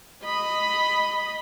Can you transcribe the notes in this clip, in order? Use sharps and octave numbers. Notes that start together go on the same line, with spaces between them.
D#5 B5